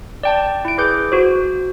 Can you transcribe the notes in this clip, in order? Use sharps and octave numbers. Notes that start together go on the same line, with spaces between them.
D5 G5 A5
E4 D7
G#4 B4 D6 G6
F#4 C5